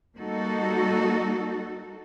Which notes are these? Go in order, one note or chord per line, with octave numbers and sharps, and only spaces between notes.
G3 A#3 D#4 F#4 A4